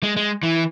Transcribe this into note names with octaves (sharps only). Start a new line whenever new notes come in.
G#3
G#3
E3